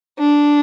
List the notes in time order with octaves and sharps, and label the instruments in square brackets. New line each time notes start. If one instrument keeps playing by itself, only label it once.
[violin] D4